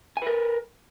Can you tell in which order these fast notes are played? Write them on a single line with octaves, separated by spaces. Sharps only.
G#5 B4 A#4